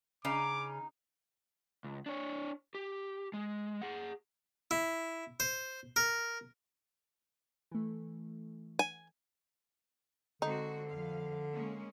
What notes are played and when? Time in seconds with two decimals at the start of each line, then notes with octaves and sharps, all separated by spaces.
0.25 C#3 D#4 D6
1.84 C#2
2.06 D4 C#5
2.75 G4
3.33 G#3
3.82 G#4 F#5
4.71 E4
5.40 C5
5.96 A#4
7.71 E3 A3
8.79 G#5
10.42 D3 G#3 C4 D#4 F#4
10.90 F2 F5
11.52 G#3 A#3 C#4